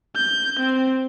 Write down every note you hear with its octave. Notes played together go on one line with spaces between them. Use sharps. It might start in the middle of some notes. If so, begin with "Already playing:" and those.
G6
C4